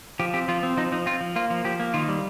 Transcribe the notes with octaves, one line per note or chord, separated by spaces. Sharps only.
F3 G4
C4 G4
F3 F4
C4
F3 D#4
F3 D#4
C4 F4
F3
A#3 F4
F3
F3 G4
A#3
D#3 F4
G3